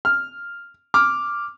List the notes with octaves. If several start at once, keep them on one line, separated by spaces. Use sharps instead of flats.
F6
D6 F6